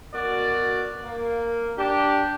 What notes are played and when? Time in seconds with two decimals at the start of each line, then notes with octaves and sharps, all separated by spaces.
0.13 B2 F#4 A#4 D5
1.03 A#3
1.78 D4 G4